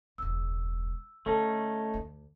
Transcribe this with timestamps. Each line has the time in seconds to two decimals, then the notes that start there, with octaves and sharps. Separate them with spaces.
0.18 E1 C#2 E6
1.26 D3 A3 C#4 D#4 A4 A5
1.94 D2